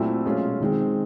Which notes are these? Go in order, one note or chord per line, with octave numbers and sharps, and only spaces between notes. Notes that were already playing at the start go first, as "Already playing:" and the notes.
Already playing: A#2 F#3 A3 C4 E4
B2 G#3 C#4 F4 G#4
D#3 G#3 C4